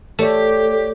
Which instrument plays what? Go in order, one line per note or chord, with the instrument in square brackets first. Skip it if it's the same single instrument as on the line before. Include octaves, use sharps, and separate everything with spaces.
[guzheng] A3 [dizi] G4 [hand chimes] A4 C#5 D5